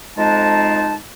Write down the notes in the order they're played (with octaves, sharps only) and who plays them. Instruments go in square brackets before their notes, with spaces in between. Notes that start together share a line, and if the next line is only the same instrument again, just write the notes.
[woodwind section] F2 G#3 D#4 A5